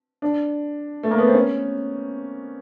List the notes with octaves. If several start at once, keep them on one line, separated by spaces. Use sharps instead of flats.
D4
A3
A#3
B3
C4
C#4